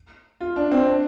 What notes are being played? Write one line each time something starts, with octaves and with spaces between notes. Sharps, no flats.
F4
D4
C4
D4